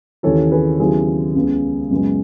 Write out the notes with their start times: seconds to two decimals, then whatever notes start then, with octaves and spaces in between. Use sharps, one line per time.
0.23 D#2 C#3 E3 A4 C#5
0.51 G#4 B4
0.79 D#2 C#3 F#3 B3 E4 G#4
1.35 C#2 C#3 G#3 B3
1.91 F#2 C#3 G#3 B3